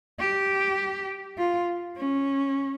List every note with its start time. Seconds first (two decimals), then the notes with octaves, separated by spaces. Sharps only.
0.19 G4
1.38 F4
1.97 C#4